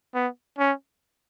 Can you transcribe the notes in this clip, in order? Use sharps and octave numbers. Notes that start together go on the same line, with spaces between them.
B3
C#4